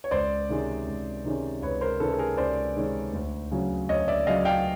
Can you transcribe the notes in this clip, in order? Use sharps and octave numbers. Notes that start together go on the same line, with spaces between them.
C#5
C#2 C5 D5
C3 D#3 G#3 C#4
C#2
C3 D#3 G#3 C#4
C#2 B4 C#5
A#4 C5
C3 D#3 G#3 C#4 A4 B4
A4
G#4 A#4
C#2 C5 D5
C3 D#3 G#3 C#4
D2
C#3 F#3
D2 C#5 D#5
D5 E5
C#3 F#3 D#5 F5
F5 G5